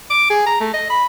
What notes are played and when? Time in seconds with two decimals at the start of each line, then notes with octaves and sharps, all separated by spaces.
0.10 D6
0.30 G#4
0.47 A#5
0.61 A3
0.74 D#5
0.90 B5